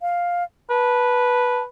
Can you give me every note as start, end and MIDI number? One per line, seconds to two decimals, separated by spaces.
0.02 0.44 77
0.70 1.65 71
0.70 1.63 81